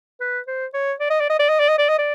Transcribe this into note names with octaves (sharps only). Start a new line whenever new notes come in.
B4
C5
C#5
D5
D#5
D5
D#5
D5
D#5
D5
D#5
D5
D#5
D5